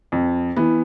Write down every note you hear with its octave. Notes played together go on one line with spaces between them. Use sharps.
F2
E3 B3